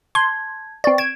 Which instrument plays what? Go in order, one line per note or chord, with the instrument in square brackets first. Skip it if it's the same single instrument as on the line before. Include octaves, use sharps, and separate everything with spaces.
[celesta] A5 G6 G#6 [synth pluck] C6
[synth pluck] C4 D5 [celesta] B4 C#6
[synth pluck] G#6 [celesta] D7 E7